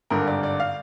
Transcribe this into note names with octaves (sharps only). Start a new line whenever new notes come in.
G#1 G2 D3 A#4
D5
D5
F5